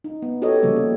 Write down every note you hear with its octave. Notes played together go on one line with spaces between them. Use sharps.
D#4
B3
F#4 G4 A4 C#5 D#5
C#3 F3 G3 A#3
G4